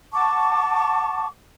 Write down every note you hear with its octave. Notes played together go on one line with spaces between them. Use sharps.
F#5 A5 C#6 D6